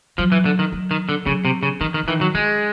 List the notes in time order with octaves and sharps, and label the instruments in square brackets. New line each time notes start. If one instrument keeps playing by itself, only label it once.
[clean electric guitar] F3 [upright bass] F#3
[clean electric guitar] E3
D3
D#3
[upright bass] F#3
[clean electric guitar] D#3
D3
[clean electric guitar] C#3 [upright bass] F#3
[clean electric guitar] C3
C#3
[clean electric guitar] D#3 [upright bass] E3
[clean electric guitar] D#3
[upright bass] D3
[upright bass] D#3 [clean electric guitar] E3
[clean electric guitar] F#3
[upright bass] D3 [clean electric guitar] G#3